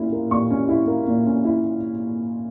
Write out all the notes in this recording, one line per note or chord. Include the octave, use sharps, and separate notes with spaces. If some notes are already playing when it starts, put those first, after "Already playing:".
Already playing: A#2 A#3 C#4 E4
A#3
A#2 C#6
C#4
E4
A#3
A#2
C#4
E4